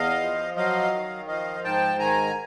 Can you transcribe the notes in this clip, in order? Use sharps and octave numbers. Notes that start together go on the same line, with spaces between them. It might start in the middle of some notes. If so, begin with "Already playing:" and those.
Already playing: E2 D#5 F5
F3
F#3 D#5 F5
D#3
F3 D#5 F5
G#2 G5 A5
D#3 G#5 A#5